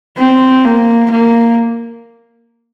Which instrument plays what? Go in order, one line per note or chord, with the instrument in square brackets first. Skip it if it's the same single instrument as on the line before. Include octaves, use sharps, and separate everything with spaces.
[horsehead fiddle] C4
A#3
A#3